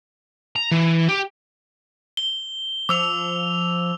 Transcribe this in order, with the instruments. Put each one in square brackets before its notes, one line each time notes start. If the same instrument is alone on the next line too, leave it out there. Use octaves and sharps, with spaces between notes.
[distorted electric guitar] A#5
E3
G4
[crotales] G7
[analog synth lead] F3 [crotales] D6 E6 F7